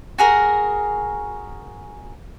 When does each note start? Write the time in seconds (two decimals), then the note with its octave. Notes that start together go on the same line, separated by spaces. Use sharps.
0.18 F#4 G#4 A#4